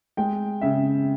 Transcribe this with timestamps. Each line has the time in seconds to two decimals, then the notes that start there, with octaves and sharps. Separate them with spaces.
0.17 G#3 G5
0.61 C#3 E5